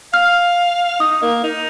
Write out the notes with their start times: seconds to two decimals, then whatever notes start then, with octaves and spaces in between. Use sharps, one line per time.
0.13 F5 F6
1.00 D#4 D#6
1.22 A#3
1.43 D#4